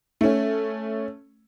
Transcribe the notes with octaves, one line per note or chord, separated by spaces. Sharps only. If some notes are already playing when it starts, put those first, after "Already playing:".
A3 C#4